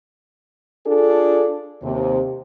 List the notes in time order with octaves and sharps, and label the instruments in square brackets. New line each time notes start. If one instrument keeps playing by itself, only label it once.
[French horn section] D4 F4 G#4 A4
D#2 C3